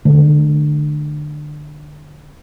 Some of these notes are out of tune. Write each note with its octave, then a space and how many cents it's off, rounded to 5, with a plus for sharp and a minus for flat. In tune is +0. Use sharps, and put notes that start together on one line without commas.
D3 +25 A3 -35